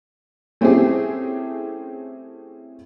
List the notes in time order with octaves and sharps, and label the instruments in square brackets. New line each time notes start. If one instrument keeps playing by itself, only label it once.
[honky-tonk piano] A3 C4 C#4 E4 G4 G#4